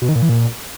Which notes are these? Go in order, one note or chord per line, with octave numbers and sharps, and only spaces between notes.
B2
D#3
A#2
E3
A#2